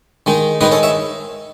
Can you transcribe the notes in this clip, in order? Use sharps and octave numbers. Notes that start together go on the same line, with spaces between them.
D#3 G#3 D#4
D#3 G#3 D#4 G#4 B4
A4 C#5
C#5 E5